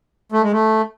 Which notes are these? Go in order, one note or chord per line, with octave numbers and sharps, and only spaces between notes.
A3
G#3
A3